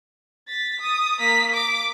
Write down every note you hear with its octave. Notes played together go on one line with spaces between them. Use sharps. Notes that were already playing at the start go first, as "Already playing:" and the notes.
A6 B6
D#6
A#3 B6
D6